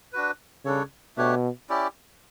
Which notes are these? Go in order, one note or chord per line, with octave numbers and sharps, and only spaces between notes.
D4 F#4 B4
C#3 G3 D4 A4 C#5
B2 A3 D4 G4 C#5
C#4 E4 G4 D5